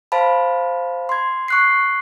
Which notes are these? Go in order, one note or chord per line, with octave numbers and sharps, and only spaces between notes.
C5 F5 A5 B5
C6 G#6
C#6 F#6 C7